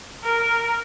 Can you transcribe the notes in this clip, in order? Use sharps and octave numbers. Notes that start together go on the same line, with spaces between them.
A#4